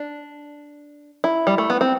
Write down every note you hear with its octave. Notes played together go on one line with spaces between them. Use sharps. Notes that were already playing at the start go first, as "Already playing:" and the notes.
Already playing: D4
E4
G3
A3
B3
C4